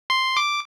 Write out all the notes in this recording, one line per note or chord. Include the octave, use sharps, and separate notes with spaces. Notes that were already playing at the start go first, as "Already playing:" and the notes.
C6
D6